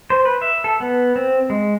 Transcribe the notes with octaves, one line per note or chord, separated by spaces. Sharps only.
C5
B4
E5
A4
B3
C4
G#3